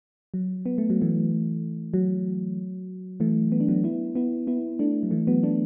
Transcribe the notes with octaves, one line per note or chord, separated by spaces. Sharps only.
F#3
B3
A3
F#3
E3 A3
F#3
E3 A3
B3
D4
F#3 B3
B3 E4
B3 E4
B3 E4
A3 D4
F#3
E3 A3
F#3 B3
A3 D4